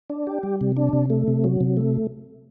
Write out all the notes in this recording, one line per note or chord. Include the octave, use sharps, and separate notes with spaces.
D4
G4
G3
C3
D4
C3
A3
C3
F#3
C3
A3